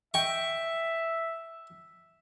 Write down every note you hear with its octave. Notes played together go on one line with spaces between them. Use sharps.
D#5 E5 G5 C#6